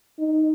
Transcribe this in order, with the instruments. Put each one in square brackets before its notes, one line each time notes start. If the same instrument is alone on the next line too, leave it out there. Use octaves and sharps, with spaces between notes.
[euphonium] D#4